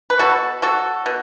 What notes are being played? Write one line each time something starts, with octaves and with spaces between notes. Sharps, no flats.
B4
B2 F#4 A4
F#3 F#4 A4
B2